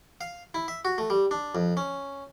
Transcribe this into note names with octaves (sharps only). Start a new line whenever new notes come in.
F5
E4
E5
F#4
A3
G3
D4
F2
C#4